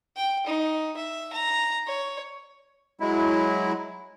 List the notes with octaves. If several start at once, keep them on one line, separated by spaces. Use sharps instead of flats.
G5
D#4
E5
A#5
C#5
F#3 G#3 E4